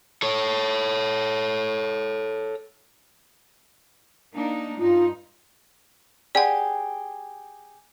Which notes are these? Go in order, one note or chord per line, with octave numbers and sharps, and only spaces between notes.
A4 C#5
A#3 D4 D#4
G2 D#4 F4
G4 G#4 D5 F#5